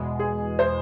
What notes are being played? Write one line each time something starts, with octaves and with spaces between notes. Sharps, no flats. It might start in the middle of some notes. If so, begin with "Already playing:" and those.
Already playing: E2 B2 G#3
G#4
B2 G#3 C5